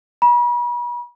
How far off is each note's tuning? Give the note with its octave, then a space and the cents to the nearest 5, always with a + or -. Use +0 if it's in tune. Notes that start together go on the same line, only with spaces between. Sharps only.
B5 -40